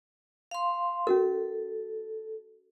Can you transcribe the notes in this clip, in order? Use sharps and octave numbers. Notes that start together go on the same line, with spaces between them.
F5 C6
C#4 F#4 A4 A#4